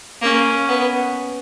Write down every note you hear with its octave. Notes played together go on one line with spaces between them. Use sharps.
A#3 C#4
B3